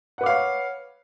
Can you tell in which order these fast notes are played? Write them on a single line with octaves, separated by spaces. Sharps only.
F#5 B4 D6 F5 C#5